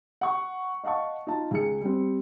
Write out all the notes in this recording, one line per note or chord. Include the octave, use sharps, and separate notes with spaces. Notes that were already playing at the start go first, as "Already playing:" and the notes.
F#5 C#6
D#5 F5 F#5 A5 C#6
D#4 F4 A5
C#2 G#4 C#7
G3 C4